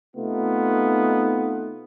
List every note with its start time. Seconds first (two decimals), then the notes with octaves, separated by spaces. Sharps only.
0.15 C3 A3 B3 D#4 F4